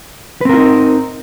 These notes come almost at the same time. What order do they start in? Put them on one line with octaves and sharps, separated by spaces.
B4 C4 A#4 F4 D#4